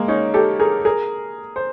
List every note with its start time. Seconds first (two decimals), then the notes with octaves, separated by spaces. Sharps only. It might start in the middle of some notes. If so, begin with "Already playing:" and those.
Already playing: G#3 A#3
0.08 C#4 D#4
0.34 G4 A4
0.60 G#4 A#4
0.85 G#4 A#4
1.56 C5